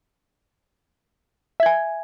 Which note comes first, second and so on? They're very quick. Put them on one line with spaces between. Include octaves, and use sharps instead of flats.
E5 G#6 G#5